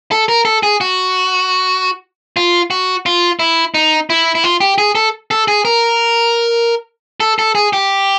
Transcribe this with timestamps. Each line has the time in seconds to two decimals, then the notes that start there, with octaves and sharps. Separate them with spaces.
0.11 A4
0.29 A#4
0.45 A4
0.63 G#4
0.81 F#4
2.37 F4
2.70 F#4
3.06 F4
3.39 E4
3.74 D#4
4.10 E4
4.35 E4
4.44 F4
4.61 G4
4.78 G#4
4.95 A4
5.31 A4
5.48 G#4
5.65 A#4
7.20 A4
7.39 A4
7.55 G#4
7.73 G4